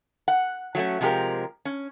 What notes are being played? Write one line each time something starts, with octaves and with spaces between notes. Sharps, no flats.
F#5
F#3 A3 C#4
C3 F3 G#3 F4 G4 A#4
C#4